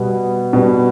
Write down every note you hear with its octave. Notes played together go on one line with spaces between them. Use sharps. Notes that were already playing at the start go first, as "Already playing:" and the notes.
Already playing: B2 G3 B3
B2 G3 B3